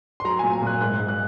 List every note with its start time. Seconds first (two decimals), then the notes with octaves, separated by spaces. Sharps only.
0.20 C6
0.25 F#3 A#5
0.39 A#2 G#5
0.53 G#5
0.63 A#2 F#6
0.81 G#2 F#6
0.99 G#2
1.08 F#6